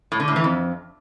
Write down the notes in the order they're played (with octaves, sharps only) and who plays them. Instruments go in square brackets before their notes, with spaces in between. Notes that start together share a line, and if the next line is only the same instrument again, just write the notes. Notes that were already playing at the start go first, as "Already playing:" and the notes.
[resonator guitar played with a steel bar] A2
D3
A2
E3
F2